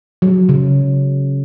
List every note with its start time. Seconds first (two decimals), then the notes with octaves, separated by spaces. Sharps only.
0.22 F#3
0.49 C#3